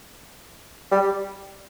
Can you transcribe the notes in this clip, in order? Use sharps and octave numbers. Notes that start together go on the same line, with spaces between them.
G3